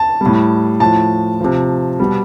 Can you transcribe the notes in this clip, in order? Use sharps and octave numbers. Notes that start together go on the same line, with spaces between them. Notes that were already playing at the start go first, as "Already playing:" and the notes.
Already playing: A5
A2 G3
A2 F3 A5
C3 F3
B2 G3